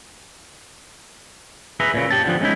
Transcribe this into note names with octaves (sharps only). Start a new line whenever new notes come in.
G#4 B4 E5 A#5
A#2 C#3
G4 A5
D3 F3 B3
G#3 C#4 D#4 E4